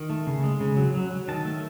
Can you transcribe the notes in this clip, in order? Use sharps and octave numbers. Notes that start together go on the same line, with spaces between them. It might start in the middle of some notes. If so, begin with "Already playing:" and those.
Already playing: D#3
A3
C#3
G#3
C#3
F#3
F#3
F#3
D#3 A5
A3